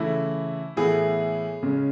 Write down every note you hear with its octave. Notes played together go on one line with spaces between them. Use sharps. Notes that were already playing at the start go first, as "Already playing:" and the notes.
Already playing: C#3 E3 A3 E4
A2 E3 B3 G#4
C#3 G#3 C#4